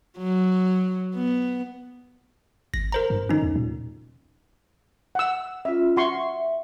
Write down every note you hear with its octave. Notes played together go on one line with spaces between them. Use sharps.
F#3
B3
G#1 A#6
A#4 C5 A#5
G2
D3 C#4 D#4
D#2
A#2
F#5 E6
C#4 F4 E5
F#4 E5 C6 C#6